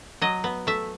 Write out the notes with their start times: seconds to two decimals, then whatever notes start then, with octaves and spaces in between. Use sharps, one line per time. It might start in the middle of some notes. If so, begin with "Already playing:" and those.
0.22 F#3 D#5
0.44 B3
0.67 A3 E5